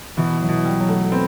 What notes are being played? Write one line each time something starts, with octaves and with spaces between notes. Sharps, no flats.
B2 E3
F#3
B2
G3
F#3
A3
B3 C4